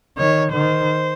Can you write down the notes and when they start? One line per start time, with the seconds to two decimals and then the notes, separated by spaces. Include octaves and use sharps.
0.18 D#3 C#5
0.53 D#3 C5